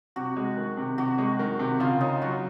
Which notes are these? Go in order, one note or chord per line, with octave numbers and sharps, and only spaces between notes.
C3 F#4
G#3
D#3
C3
C3 F#4
G#3
D#3
C3
C#3 F4
C#4 D#4
F#3 F#4